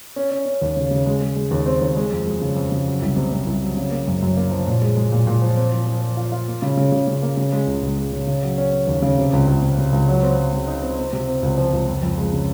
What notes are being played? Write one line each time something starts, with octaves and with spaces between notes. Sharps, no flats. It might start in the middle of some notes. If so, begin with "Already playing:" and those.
C#4
C#4
C#4
D#2
C#3
C#3
G#3
G#3
G#3
D#2
C4
D#2
G#3
F2
G#3
C#3
F2
C#3
F#3
C2
C3
C3
C2
F#3
C#3
A#3
F#2
F#2
A#3
F3
A#2
G#3
G#3
A#2
A#2
F3
C4
F3
F3
F3
F4
F4
A#3
C#3
C#3
C#3
C#3
A#3
C#3
G#3
C#2
C#2
G#3
C#3
C#3
F#3
C#4
C#4
D#2
C#3
C3
C#2
C#2
C3
C3
C#2
F#3
C4
F#3
C#3
D#4
C4
C4
C3
C4
C#2
F3
C#2
F2
F2
G#3
C#3